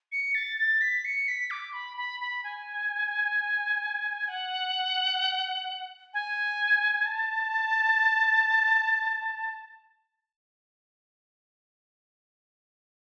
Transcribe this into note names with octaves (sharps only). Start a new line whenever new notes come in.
C#7
A6
A6
B6
C#7
B6
D6
B5
B5
B5
G#5
F#5
G#5
A5